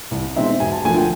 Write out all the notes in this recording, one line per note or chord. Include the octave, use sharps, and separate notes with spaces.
C2
B2 G#3 C4 D#4 E5
E1 G#5
A5
D2 D3 F3 A#3 G#5
G5